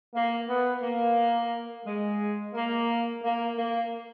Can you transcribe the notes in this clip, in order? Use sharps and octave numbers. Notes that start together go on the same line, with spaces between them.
A#3
B3
A#3
G#3
A#3
A#3
A#3